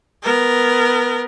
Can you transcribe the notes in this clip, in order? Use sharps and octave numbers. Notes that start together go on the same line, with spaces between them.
B3 A#4